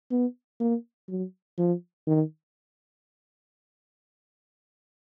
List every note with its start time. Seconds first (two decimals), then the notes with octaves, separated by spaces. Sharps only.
0.11 B3
0.60 A#3
1.09 F#3
1.58 F3
2.07 D#3